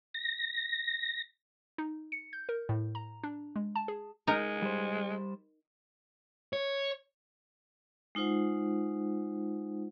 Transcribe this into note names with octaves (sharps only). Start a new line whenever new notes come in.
A#6
D#4
C#7
G6
A#4
A2
A#5
D4
G#3
A5
G#4
G#3 D#4 A#4
G3 C5
C#5
G#3 D#4 F4 C5 F#5